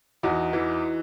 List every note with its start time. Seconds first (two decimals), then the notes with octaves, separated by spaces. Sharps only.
0.23 E2 D#4 F#4
0.53 E3